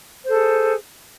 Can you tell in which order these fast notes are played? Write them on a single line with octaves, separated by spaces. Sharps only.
C5 A4 G#4